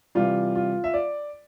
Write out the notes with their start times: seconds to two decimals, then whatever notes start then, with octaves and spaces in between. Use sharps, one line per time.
0.15 C3 E3 G3 F4
0.55 F4
0.84 E5
0.94 D5